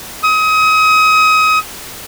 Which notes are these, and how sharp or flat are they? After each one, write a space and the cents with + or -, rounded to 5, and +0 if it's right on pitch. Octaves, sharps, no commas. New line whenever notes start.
D#6 +30